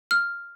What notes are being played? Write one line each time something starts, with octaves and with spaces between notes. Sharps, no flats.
F6